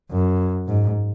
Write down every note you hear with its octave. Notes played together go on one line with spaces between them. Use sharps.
F#2
G#2